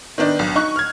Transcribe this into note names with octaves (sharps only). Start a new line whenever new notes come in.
D#3 B3 D4 D#4
B1
D#4 C#6 F#6
F6 G#6